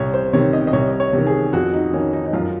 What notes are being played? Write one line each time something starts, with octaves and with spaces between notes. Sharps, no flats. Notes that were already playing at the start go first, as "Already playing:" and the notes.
Already playing: C2 C#5
C5
C3 D#3 C#5
D#5
D#5
C2 C#5
C#5
C3 D#3
G#4
F2 F#4
D#4
D#3 C#4
D#4
D#4
F#2 F4